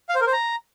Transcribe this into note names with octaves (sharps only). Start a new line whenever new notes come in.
F5
C5
A#4
C5
A#5